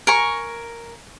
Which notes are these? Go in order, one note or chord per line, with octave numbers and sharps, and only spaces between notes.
A#4 G#5 C#6